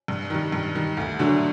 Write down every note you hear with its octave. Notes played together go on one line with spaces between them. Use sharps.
G2
D#3 G3
G2
D#3 G3
D2
D3 F#3 A3 D4